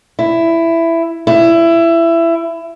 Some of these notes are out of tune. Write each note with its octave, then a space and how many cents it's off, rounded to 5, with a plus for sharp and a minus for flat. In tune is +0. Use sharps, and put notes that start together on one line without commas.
E4 +10
E4 +20